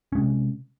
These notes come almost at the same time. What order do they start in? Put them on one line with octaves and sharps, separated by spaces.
C#4 G#3 C3